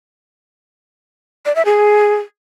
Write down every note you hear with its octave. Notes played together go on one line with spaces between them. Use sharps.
D5
E5
G#4